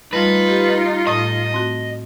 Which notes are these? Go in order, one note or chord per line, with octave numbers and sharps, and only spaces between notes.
G3 A3 D#4 F4 B4
G4
A2 A3 D#5 D#6
A3 C4 F#4